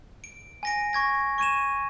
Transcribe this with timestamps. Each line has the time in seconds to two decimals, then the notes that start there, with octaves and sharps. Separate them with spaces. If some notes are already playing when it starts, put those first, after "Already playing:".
0.24 D7
0.63 G#5 A#6 D7
0.93 C#6 G#6 A#6
1.38 C#6 G#6 D#7 E7